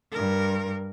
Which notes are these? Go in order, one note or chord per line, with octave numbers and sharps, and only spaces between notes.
G2 A#4